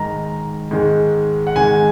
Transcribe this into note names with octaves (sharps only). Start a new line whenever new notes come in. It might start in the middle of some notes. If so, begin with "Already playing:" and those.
Already playing: G#2 D#3 G#3 A#5
G#2 D#3 G#3
F#5
G#2 D#3 G#3 G#5